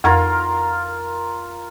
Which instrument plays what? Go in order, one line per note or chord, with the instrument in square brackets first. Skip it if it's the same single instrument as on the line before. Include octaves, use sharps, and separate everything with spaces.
[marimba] F2 C#6 G#6 [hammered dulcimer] F4 A#4 F5